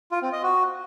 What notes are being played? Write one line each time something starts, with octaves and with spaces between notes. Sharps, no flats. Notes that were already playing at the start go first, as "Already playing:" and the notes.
F4
C4
D#5
F#4